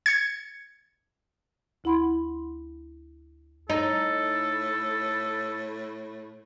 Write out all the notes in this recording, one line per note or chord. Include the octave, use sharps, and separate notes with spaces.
G#6 C#7
D2 E4 F#5 B5 C6
A2 D#4 A4